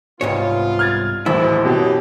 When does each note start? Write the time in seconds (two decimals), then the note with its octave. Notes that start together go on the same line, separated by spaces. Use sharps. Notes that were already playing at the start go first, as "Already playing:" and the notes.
0.21 C2 G#2 B3 F4 C#5
0.79 F6 G#6 A6
1.26 A1 D#2 G#2 B2 F#3 E4 C5
1.65 F#2 B2 G4